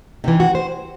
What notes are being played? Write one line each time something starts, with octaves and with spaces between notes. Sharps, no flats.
C3 E3 D#4
F#4
C5